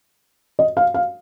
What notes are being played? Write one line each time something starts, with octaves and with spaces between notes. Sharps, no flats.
D#5
F5
F5